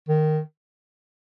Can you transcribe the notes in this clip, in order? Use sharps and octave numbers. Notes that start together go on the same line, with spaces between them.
D#3